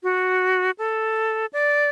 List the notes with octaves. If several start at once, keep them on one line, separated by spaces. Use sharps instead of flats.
F#4
A4
D5